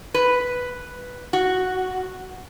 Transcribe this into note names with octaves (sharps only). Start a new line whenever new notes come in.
B4
F#4